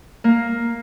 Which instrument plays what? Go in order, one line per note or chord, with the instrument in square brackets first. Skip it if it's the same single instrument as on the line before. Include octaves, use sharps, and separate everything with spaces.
[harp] A#3